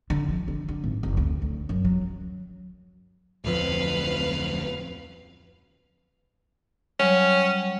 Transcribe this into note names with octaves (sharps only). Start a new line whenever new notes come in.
D3
F3
D3
D3
G#1
F#1
D2
D2
F#2
F#3
D1 F2 F3 B4 F5
F#3 G3 C#4